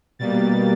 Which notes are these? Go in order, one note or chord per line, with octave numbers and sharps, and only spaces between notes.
B2 G3 A#3 A6